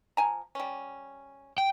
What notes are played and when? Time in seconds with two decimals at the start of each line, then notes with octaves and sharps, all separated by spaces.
0.17 F3 G#5 A#5
0.55 G3 C#4
1.58 G5